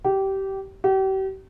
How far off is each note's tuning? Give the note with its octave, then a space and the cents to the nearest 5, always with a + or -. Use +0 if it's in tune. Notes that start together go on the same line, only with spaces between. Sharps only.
G4 -20
G4 -40